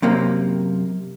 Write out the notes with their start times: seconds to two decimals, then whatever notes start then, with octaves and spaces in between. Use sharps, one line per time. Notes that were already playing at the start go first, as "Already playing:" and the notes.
0.02 F#2 C3 A#3